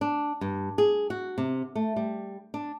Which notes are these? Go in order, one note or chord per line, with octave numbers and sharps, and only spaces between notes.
D4
G2
G#4
F#4
C3
A3
G3
D4